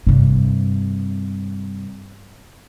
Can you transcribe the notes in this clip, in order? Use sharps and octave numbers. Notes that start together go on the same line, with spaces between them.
G2 C3